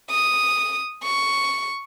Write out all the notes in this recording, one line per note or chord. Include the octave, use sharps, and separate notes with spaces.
D#6
C#6